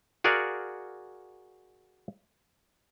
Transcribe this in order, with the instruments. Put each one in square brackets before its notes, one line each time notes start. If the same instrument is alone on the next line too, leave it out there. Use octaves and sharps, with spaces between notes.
[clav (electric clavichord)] F#4 G#4 A#4 D5 F5 F#5